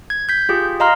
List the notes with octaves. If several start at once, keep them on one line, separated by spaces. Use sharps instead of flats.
G#6
G6 B6
F4 G4 G#4
D#5 F5 A#5 C6 F6